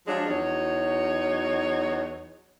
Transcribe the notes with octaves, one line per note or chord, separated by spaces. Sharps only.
F3 F#3 G#3 D4
E2 F#3 D#4 F#4 C#5